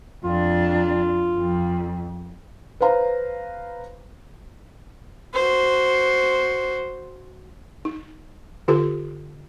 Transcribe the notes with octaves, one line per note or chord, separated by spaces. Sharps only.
F2 D4 F4
F2
B4 C5 F5 A#5
F#4 C5
D#4
D3 F4 G4 A4